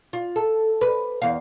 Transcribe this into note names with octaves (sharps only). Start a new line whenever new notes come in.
F4
A4
B4
E2 F5